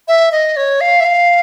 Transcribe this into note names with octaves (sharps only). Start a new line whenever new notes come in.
E5
D#5
C#5
F5
E5
F5